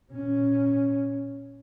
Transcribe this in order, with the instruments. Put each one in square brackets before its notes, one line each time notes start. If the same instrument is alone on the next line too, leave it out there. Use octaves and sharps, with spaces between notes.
[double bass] A#2 C#4